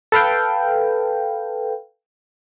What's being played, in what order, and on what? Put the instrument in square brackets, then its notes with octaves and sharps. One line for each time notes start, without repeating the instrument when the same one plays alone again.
[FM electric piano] A4 B4 F5 G5